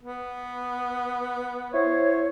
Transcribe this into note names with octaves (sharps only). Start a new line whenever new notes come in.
B3
E4 C5 C#5